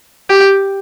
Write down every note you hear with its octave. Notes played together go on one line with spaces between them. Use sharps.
G4